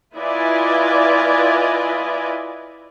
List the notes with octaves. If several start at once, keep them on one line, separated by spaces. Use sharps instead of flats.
E4 F4 B4 D5 D#5 G#5